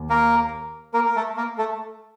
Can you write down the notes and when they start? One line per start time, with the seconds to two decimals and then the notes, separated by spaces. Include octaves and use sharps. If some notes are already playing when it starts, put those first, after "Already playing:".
Already playing: D#2
0.10 A#3 A#4
0.94 A#3 A#4
1.06 A#4
1.16 A3 A4
1.36 A#3 A#4
1.58 A3 A4